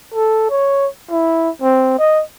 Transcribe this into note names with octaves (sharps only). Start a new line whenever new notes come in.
A4
C#5
E4
C4
D#5